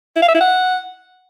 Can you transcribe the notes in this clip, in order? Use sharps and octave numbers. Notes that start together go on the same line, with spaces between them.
E4
F5
E5
E4
F#5